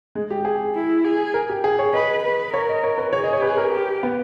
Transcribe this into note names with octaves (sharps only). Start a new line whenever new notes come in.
G#3
G4
G#4
E4
G#4
A#4
G4
G#4
C#5
B4 D#5
B4
A#4 C#5
D#5
C#5
B4
G#4 C#5
D#5
C#5
B4
A#4
G4
B3